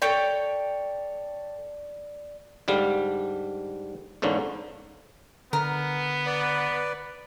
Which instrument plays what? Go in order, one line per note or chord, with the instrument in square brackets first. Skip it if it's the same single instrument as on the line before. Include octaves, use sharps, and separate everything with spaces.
[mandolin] A4 C#5 G5 [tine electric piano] D5
[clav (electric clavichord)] G#2 D3 G3 F5
E2 G#2 D3 A#3 C#4
[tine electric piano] D3 [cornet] B3 [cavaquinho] A#4
[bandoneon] B4 D5